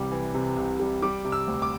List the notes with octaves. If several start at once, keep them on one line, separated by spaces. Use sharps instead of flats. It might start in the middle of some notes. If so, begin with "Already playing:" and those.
Already playing: C2 C3 E3 G3 D6
E3
C3
C2
G3
G3 D6
C3
E6
D2
D6